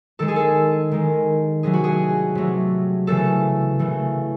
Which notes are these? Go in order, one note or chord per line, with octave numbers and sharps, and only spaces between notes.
D#3 G#3 A4
G#4
A4
D#3 G#3
C3 F#3 A3 G#4
F#4
G#4
C3 F#3 A3
C#3 E3 A3 A4
C#3 E3 A3